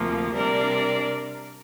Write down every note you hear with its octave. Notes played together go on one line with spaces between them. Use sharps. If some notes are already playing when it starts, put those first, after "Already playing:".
Already playing: D2 C3 F3 A#3
C3 G3 D4 A#4 D5